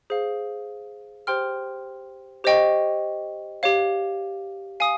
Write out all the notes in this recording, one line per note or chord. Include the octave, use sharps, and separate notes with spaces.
G#4 C5 F5
G4 C5 G5 C6 F6
G4 C5 D#5 G5 C#6
G4 C#5 F5
F5 G#5 D#6